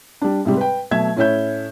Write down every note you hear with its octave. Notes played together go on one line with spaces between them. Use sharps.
G3 D4
G#2 C3 G3
B4 G5
B2 F#3 A3 E5 G#6
A2 C#4 E4 C#5 E5 G6